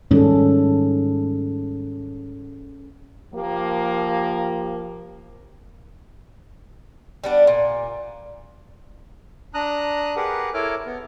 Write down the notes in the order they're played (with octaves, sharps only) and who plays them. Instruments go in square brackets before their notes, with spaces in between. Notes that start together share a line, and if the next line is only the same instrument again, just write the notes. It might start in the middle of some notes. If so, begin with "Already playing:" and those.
[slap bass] G#2 D#3 G3 [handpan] C#4 G#4 A4
[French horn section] F3 A#3 G4
[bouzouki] G3 B3 D4
A#2
[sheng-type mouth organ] D4 A#5 D#6 F#6
G4 G#4 A#4 B4 F#5
E4 A4 A#4 C#5 D6 F6
B3